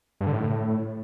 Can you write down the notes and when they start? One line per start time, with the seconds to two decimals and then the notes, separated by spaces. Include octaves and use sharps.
0.21 G2
0.27 D3
0.33 A2